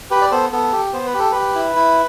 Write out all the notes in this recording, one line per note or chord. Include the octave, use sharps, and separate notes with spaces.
G4 B4
D5
B3 A4 C5
B3 A4
G4
B3 C5
B4
G4
A4
G4 B4
E4
E4